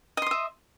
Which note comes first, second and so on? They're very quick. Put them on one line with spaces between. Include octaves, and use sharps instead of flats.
D#5 C6 D#6 E5